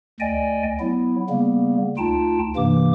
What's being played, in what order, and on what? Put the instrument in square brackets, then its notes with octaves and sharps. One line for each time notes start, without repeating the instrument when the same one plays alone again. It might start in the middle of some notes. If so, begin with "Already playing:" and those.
[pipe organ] D2 D5 D#5 G5 G#5
F#3 B3 E4
C#3 G3 A#3 B3
D2 D#4 F4 G5 A5
G2 C3 E3 A#3 D6